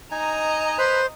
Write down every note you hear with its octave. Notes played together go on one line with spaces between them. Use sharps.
D#4 D#5 G#5 A#5
B4 C5 B5